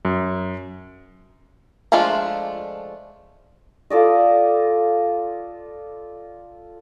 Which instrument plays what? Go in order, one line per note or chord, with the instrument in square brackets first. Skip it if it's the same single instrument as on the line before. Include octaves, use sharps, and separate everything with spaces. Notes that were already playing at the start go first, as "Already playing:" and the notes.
[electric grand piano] F#2
[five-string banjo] F3 G#3 A3 D4 F4
[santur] F4 A4 D5 D#5